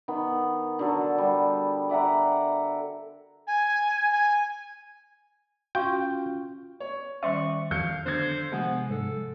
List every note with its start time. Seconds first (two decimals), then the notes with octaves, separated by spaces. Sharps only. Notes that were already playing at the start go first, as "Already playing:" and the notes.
0.08 D#3 B3
0.79 D3 F#3 A4
1.18 G3
1.89 D5 E5 F#5 A#5
3.47 G#5
4.12 G#5
5.75 C#4 F4 F#4 F5 G5 C#6
6.80 C#5
7.23 D#3 G3 C#4 C5 D5 E5 C#6
7.71 F2 F5 G6 C#7
8.06 D3 C5 G#6
8.52 C3 F3 G#3 B3
8.90 G#2 A4